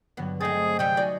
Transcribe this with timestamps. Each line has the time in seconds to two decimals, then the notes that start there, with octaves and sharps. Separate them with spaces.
0.17 G2 D3 F#3 B3
0.41 A3 C4 G#4 D#5 A6
0.79 C3 G3 A3 G5
0.97 D#4 F#4 D5 G#5